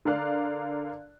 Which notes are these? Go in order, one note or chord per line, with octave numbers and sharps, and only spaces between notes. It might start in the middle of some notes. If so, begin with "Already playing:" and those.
D3 A#4 D5 F5 F#6